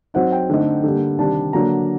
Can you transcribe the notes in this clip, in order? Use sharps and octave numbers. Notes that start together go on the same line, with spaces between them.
F#3 C4 D#4 F#5
G5
D3 A3 C4 D#4
D3 G3 A#3
C3 D#3 G3 D4 A5
D3 F#3 A#3 D4 A#5